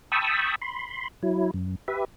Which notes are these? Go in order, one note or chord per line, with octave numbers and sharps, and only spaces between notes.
G5 A5 B5 C#6 D#6 E6
B5 C6
F#3 E4
F#2
G4 B4 E5